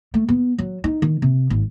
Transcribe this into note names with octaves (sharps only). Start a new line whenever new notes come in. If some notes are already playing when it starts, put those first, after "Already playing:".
A3
B3
F#3
D#4
D#3
C3
G#1